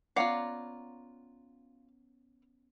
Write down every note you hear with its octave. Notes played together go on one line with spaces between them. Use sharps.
B3 C#4 F4 D5 F5 F#5 A#5